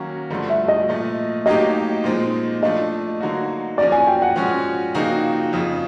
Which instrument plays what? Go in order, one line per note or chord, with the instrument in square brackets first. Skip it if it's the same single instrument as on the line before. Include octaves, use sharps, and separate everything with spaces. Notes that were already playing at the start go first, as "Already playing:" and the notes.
Already playing: [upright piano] D#3 F#3 A#3 C#4 F#4
G2 D3 F3 A3
[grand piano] E5
D#5
[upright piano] A#2 F3 A3
[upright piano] A2 F#3 A#3 D#4 G4 [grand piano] D#5
[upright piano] A#2 F3 G#3 C4 D#4
[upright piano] F3 A3 D4 F4 [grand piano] D#5
[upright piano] D3 F#3 A#3 D#4 F#4
[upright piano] F3 A#3 C#4 F#4 [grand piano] D5
[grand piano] G#5
G5
F#5
[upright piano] F3 G#3 C#4 F#4
C#3 F3 A#3 D#4 F#4
F2 C#3 F3